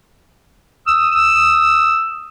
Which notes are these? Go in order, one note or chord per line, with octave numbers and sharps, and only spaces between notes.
D#6 E6